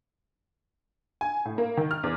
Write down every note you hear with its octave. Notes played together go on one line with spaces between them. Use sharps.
G#5
A2
A#3
D#3
F6
E2